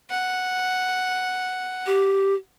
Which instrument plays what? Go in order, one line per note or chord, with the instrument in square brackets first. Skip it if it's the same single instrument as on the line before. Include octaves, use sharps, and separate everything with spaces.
[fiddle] F#5
[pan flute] G4